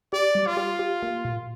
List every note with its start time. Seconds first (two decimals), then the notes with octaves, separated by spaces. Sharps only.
0.13 G4 D5
0.35 G3
0.47 F4
0.57 G4
0.79 G4
1.02 A#3
1.25 A#2